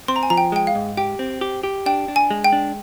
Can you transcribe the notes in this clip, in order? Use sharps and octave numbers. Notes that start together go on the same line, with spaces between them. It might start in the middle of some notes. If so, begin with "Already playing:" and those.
C4 C6
A#5
G#5
F3 A#5
G5
G#3 G5
F5
G#2
G4 G5
C4
G4
G4
D4 G5
D4
G#5
G#3
G5
D4